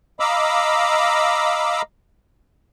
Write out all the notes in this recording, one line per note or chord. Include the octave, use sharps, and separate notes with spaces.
D#5 F5 A#5 B5 D6 E6